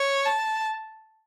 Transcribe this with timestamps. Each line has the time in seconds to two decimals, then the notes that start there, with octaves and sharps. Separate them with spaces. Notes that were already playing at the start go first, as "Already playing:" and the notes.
Already playing: C#5
0.25 A5